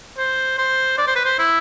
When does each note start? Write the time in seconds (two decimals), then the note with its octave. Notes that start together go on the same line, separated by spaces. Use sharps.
0.17 C5
0.58 C5
0.98 D5
1.07 C5
1.16 B4
1.25 C5
1.38 E4